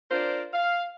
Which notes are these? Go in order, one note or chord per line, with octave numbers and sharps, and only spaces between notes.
D4 F4 A#4 C5 D5
F5